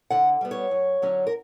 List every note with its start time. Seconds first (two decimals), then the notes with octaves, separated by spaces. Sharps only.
0.10 D3 F#5
0.41 G3 B3
0.51 C#5
0.71 F#2
1.02 D3 F#3 C#4
1.27 A#4